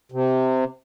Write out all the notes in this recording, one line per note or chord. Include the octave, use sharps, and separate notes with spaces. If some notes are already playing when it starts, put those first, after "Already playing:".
C3